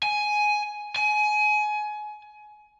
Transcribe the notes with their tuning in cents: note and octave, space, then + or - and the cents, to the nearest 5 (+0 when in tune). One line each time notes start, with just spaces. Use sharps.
G#5 +10
G#5 +25